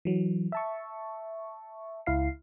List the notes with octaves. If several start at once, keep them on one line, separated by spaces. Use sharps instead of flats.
E3 F#3
E5 A5 C#6
C#2 E4 F5 C7